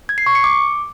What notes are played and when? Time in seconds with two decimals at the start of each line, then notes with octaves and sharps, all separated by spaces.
0.09 G#6
0.18 C7
0.26 C#6
0.35 C#7
0.44 D6